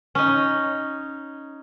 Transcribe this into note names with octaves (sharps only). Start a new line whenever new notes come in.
C#4 D#4